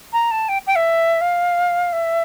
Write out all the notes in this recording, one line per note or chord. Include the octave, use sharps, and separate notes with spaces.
A#5
A5
G5
G5
E5
F5
E5